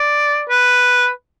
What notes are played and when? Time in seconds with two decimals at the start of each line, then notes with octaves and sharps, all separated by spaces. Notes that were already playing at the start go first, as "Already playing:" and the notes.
Already playing: D5
0.49 B4